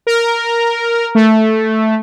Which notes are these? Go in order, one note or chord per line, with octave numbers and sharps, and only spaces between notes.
A#4
A3